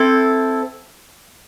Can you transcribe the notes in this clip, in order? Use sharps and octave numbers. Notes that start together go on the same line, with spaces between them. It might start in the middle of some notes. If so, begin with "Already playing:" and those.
Already playing: C4 E4 A4